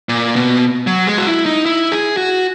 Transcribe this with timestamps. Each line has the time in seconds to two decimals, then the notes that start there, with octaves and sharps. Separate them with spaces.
0.09 A#2
0.36 B2
0.87 F#3
1.07 G#3
1.18 F#4
1.27 E4
1.46 D#4
1.66 E4
1.92 G#4
2.17 F#4